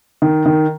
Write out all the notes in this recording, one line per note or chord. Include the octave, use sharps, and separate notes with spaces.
D#3
D#3